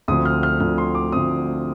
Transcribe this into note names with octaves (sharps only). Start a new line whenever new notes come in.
D2 D3 F3 C4 D#6
F6
F6
D2 D3 F3 C4 F6
C6
D6
D2 D3 F3 C4 D#6